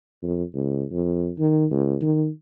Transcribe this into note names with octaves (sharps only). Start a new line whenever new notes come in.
F2
C#2
F2
D#3
C#2
D#3